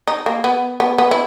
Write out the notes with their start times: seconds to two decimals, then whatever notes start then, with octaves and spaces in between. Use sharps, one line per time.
0.07 D#4
0.26 A#3
0.44 B3
0.80 B3
0.98 B3
1.11 E4